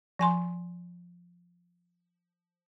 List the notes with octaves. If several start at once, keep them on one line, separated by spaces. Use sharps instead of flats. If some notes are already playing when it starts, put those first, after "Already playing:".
F3 G#5 C6